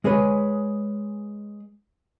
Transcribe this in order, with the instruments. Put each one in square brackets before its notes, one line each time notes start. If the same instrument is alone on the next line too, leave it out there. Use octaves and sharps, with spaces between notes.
[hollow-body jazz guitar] G#3 G#4 B4 C#5